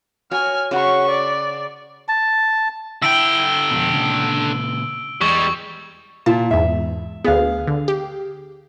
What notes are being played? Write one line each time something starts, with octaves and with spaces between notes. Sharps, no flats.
F#4 C#5 G#5 F6
C#3 F#4 C#6
D5
A5
D3 E4 G5 E6 D7 F#7
F2 B2
A#2 C#3
E2 G3 G#3 C#6
A#2 A5
E2 G#2 E5
D2 B3 G#4 F5
D3
G4